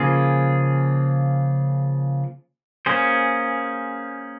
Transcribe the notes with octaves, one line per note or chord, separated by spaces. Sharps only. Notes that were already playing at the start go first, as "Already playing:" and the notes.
Already playing: C#3 F3 A#3 F4 G#4
A#3 C#4 G#4 C5